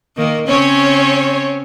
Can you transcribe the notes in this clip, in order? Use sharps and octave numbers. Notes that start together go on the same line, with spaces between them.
D#3 A#3
C#3 C4 C#4 C#5